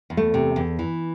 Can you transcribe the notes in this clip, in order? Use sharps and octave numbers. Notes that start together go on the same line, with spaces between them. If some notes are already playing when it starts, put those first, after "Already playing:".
E2
A3
C3
E2
E3